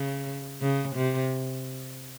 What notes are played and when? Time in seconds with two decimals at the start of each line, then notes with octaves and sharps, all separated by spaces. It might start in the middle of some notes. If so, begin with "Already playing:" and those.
Already playing: C#3
0.61 C#3
0.95 C3